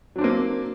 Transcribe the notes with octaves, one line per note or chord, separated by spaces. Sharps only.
F#3 A#3 C4 D4